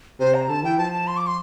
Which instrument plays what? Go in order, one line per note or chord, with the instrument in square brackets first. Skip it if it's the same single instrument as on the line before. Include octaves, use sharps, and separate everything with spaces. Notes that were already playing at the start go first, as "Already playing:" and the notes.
[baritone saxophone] C3 [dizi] C5
[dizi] A#5
[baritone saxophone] D3 [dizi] A5
[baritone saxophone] E3 [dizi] G5
[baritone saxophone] F3 [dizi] A5
[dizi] A5
C6
D6
C6